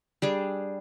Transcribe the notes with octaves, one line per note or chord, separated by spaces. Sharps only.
G3 D4 G#4